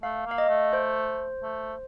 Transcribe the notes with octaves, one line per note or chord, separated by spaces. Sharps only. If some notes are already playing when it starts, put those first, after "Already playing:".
A3 F5
A#3 F5
D#5
A3
C5
A3